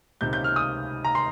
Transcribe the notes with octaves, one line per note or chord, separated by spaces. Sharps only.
C#2 C3 D#3 G6
G6
F6
D#6
A#5
C6